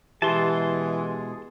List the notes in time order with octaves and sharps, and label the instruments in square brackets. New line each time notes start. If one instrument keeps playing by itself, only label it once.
[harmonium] B2 G#3 G#4 [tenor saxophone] E3 [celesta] G4 [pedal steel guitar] A5 C6